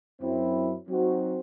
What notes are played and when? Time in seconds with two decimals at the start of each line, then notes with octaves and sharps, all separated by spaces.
0.21 F#2 F#3 C4 E4
0.86 F#3 C4 D#4 F#4 C5